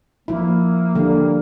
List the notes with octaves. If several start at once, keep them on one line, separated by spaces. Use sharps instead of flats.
F3 A#3 E4
D3 G3